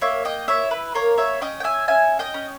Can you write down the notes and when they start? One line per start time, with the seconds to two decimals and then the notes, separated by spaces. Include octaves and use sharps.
0.01 A#3 C#5 E5
0.25 D#5 G5
0.48 E4 C#5 E5
0.71 B4
0.94 A#3 A#4 C#5
1.18 C#5 E5
1.41 C#4 D#5 G5
1.60 G5
1.64 E5 G#5
1.88 C#4 E5 G#5
2.19 D#5 G5
2.34 C#4